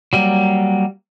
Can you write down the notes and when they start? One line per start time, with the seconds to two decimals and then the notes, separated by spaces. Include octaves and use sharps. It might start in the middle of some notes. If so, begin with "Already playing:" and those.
0.13 F#3 G3 A#3